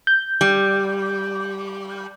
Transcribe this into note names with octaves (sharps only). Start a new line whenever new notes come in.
G6
G3